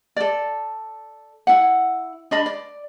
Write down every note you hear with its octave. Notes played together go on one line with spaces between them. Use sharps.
A4 D5
E4 F#5
D4 D#5 B5
D5